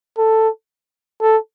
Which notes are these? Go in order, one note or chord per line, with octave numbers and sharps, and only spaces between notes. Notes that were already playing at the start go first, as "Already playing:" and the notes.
A4
A4